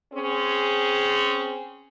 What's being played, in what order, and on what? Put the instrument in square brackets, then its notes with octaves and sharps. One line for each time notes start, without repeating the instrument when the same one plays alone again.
[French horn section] C4 C#4 G#4